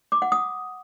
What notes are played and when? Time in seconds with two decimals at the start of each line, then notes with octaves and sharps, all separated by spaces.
0.12 D6
0.22 F#5
0.32 D#6